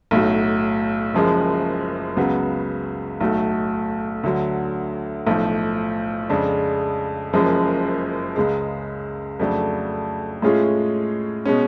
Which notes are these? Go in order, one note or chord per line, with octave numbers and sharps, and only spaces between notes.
B1 A2 F#3
F#1 F#2 F3 G#3
C#2 C#3 F#3 B3
B1 A2 F#3 A3
D2 D3 F#3
B1 A2 F3
F2 C#3 G#3 D4
F#1 F#2 F3 G#3
C#2 C#3 G#3
F2 C#3 F#3 A3 D4
A2 G#3 C#4 F4 G#4
B2 G#3 C#4